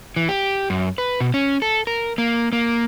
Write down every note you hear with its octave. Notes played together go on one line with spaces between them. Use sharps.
E3
G4
F#2
B4
B2
C#4
A4
A#4
A#3
A#3